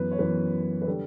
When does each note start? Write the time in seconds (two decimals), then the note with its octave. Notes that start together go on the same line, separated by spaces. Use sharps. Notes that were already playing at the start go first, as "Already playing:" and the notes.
Already playing: F#2 E3 B3 B4
0.11 C#5
0.19 F#2 E3 B3 B4
0.82 B4
0.87 D3 G3 A4